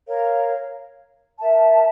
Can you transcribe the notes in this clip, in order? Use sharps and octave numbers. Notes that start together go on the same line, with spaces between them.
A#4 C#5 F5
A#4 E5 A5